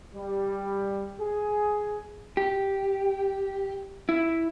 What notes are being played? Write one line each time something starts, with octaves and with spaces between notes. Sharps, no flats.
G3
G#4
G4
E4